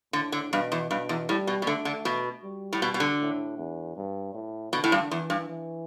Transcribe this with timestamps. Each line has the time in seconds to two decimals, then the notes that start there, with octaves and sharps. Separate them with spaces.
0.13 A2 D3
0.32 D3
0.52 G2 B2
0.72 E2
0.91 G2 B2
1.09 E2
1.29 A2 G3
1.47 B2
1.62 B2
1.66 D3 A3
1.85 D3
2.05 B2
2.44 G3
2.73 A2
2.82 B2
2.94 B2
3.00 D3
3.20 A2
3.58 E2
3.97 G2
4.34 A2
4.73 B2 D3
4.84 A2
4.92 G2
5.11 E2 E3
5.30 G2
5.49 E3